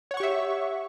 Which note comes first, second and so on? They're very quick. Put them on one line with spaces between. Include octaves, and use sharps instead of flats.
C#5 F#5 C#6 G4 E5